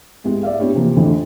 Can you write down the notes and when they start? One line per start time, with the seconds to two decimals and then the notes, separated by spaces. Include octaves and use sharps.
0.24 G#3 B3 E4 G4
0.43 D5 E5 F5
0.59 B3 D4 E4 G4 C#5
0.75 C3 E3 F3 A#3
0.95 F2 A2 D3 E3 F3